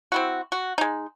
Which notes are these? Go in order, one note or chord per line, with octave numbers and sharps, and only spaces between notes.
C4 E4 F#4
F#4
G#3 D#4